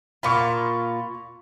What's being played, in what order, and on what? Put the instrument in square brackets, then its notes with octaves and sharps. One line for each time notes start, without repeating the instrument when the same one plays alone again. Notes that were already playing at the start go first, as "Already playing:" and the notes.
[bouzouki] A#2 F4 [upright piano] B5 C#6